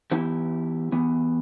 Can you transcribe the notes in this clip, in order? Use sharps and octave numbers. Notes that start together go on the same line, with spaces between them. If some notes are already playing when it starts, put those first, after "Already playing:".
E3 B3 E4 G4
E3 B3